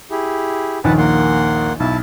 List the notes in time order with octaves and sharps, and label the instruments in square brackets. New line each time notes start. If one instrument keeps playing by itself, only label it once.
[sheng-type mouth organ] E4 G4 G#4
[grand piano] A#1 D#2 D#3 [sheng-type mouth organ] B4 F#5 A5
[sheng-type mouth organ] A#3 F#5 C6
[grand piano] B1 [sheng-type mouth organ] E4 A5